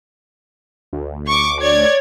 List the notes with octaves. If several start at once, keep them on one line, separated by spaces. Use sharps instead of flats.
D2
C#6 D6
C#5 D5 G#6